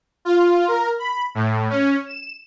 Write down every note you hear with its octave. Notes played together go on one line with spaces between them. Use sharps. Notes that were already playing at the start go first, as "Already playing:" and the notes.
F4
A#4
B5
A2
C#4
E7